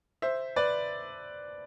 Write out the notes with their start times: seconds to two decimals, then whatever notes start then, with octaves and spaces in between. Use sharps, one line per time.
0.22 C5 E5
0.56 B4 D5